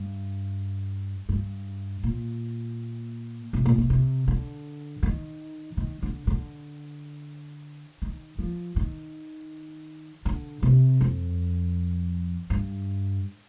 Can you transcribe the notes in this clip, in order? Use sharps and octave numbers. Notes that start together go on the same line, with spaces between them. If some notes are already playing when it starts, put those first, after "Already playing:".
Already playing: G2
G2
A#2
C3
A#2
C3
C3
D3
D#3
D#3
D3
D3
D#3
F3
D#3
D3
C3
F2
G2